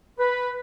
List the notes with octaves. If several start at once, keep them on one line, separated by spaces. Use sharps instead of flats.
B4